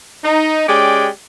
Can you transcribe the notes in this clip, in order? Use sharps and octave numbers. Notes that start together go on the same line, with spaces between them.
D#4
G#3 C#4 G4 D5 G5